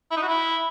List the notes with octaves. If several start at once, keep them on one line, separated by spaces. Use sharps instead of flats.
E4
D#4
F#4
E4